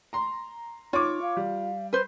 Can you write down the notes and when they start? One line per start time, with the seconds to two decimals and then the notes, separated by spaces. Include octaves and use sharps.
0.13 A#5 C6
0.93 D#4 F4 C#5 D6
1.22 F5
1.37 G3
1.93 B4 C5